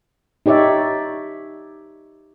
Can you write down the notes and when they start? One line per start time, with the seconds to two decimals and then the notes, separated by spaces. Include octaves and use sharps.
0.46 D#4 G4 C#5 D5 E5